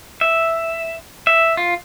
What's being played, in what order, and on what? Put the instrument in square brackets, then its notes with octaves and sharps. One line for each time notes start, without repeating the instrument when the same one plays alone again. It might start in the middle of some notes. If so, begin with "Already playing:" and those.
[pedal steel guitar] E5
E5
F4